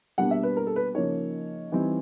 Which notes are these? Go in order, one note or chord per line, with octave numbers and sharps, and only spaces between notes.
B2 G3 A#3 D4 F#5
E5
B4
A#4
A4
B4
C#3 F3 A#3 D#4 C#5
E3 G3 C4 D#4